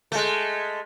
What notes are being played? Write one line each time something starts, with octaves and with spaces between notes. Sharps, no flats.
G#3 A3